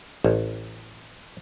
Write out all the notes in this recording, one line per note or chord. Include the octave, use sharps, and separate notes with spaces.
A1